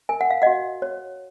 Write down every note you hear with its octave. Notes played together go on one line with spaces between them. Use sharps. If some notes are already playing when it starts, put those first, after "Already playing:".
A#4 G#5
F#5
F5
F#4 D#5 F#5
C#5